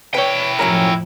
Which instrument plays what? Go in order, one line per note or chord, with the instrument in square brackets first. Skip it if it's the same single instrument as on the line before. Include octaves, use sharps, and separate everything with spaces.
[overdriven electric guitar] E4 G5 [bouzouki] B4 C#5
[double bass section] F2 A2 F3 [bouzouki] F#3 C#4 A#4